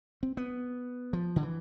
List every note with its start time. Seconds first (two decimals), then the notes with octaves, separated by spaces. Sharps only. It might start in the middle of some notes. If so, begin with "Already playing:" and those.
0.23 C4
0.37 B3
1.13 F3
1.36 D3
1.43 E3